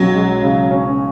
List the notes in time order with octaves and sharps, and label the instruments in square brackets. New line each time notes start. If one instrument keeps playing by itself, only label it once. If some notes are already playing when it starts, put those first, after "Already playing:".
Already playing: [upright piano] B1 C#4 [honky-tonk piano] F#3
[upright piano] G#3
C#3
C#4